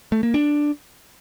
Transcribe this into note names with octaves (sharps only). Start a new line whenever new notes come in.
A3
A#3
D4